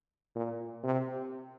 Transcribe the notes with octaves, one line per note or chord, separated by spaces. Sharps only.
A#2
C3